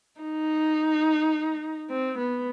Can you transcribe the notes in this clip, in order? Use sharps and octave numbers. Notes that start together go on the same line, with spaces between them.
D#4
C4
B3